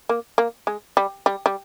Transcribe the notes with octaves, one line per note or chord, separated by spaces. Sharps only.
A#3
A#3
G#3
G3
G3
G3